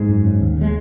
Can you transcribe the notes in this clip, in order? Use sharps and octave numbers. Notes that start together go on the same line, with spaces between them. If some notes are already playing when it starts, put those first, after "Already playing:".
Already playing: G#2 G#3
F#2
C#3
D#2
C#3 G#3